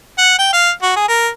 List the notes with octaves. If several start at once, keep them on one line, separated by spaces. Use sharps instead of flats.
F#5
G5
F5
F#4
G#4
A#4